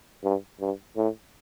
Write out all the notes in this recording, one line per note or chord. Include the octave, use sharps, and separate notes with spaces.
G2
G2
A2